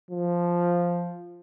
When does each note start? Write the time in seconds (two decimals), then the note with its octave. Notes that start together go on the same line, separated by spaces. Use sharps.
0.11 F3